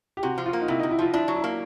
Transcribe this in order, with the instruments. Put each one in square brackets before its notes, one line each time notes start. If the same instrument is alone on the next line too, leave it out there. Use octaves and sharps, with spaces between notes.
[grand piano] G4
[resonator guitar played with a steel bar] C3 [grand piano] F#4
[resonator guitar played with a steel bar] F3
[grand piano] F4
[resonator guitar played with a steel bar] A#3
[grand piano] D#4
[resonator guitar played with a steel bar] C3 [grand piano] E4
[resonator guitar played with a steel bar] C3 [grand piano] D#4
[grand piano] E4
[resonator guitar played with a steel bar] F3 [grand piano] F4
[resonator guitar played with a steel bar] D4 [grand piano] E4
[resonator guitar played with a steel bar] F#3
[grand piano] E4
[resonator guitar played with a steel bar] A#3